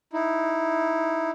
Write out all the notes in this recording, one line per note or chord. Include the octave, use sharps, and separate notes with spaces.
D#4 E4